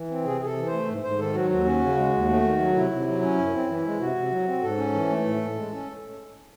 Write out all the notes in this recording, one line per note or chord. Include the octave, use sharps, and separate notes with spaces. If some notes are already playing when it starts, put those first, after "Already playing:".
Already playing: E3
C4
C3 G#4
C3 G#4
A4
E3
C5
A3
G#2
G#2 C5
D#3 A4
F#3 F#4
D#2 F#4
C#4
C#3
G#3
D#2
A3
D#3
F#3
C3 E4
C3
F#3
C#4
F#2
C4
E3
G#3
C3 F#4
C3
F#3
C4
G#2 A4
C#4
E3
A3
A2
A2
G#3
C#4